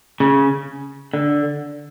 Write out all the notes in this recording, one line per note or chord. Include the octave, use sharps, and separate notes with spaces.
C#3
D3